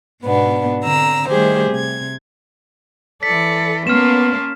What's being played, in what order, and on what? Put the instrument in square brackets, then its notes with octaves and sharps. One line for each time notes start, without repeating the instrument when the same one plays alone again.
[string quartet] G#2 B2 B3 D4
D3 C4 A#5 E6
D#3 G3 A3 G4 G#4 C5
C3 G#6
[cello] E3 A4 [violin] D5 C#7 [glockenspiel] B6
[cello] A#3 C#4 [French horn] B3 [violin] A5 C6 [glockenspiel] F6 E7